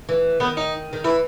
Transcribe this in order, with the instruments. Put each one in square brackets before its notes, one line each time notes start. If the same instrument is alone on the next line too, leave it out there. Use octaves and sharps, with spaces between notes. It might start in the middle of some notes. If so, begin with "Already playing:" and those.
[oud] E3
[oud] D#3 [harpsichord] B3
[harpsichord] D#4
[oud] D#3
[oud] E3 [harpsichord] E4